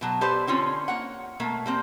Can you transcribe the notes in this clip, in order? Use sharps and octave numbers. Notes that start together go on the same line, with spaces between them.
B2 F#3 A5
G4 A4 B4 C5 D5
D3 C4 C#4 F4
A#3 C#5 F#5
B2 A3 A#3
G3 A#3 C4